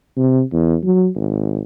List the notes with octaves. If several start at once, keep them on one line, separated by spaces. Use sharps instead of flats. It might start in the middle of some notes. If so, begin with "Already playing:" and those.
C3
E2
F#3
G#1